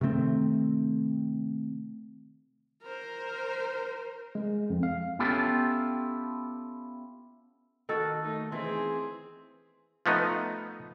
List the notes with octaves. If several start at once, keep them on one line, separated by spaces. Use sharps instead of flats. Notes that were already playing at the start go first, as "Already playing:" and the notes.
C3 D#3 A3 C4
A#4 C5
G#3
F2
F5
B3 C#4 E4 F4 G4 A4
D#3 F#4 A4
A3 D#4
E3 C4 G#4
F3 A3 B3 D#4